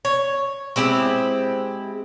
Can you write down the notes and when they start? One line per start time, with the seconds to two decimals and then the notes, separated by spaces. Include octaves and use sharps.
0.05 C#5
0.76 G#3 C4 E4 G4